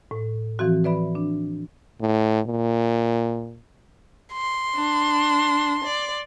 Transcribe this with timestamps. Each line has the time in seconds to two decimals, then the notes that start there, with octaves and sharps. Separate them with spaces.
0.11 A2
0.59 E3 F3 C4 F#4
0.84 B4 D5 E5 B5
1.15 D4
2.01 A2
2.46 A#2
4.33 C6
4.75 D4
5.84 D5